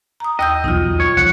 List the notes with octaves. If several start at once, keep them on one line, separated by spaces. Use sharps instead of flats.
A#5 D#6
D#2 D#5 E6 G6
B1 E2 F#3 D#4 F4
C#5
C2 F3 F#5